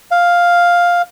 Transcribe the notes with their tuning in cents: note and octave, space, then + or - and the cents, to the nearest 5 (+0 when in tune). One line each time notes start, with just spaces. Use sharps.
F5 +5